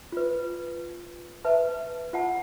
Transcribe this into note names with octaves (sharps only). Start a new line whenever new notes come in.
F4 B4
B4 E5 A5
F4 F#5 A5